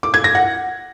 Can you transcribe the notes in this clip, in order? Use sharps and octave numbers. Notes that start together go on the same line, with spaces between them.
D6
G#6
A#6
F#5